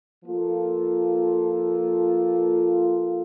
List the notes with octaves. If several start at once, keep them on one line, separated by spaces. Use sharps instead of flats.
F3 A#3 F4 A4